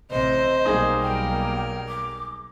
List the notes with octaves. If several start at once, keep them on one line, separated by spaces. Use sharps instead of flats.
A1 C3 C5 D#5
B1 G3 A#3 D#4 G#4
A#4 G5
D6